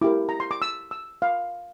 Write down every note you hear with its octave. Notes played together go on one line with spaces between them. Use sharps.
E4 G4 A#4 D6
A#5
C6
D6
E6
E6
F5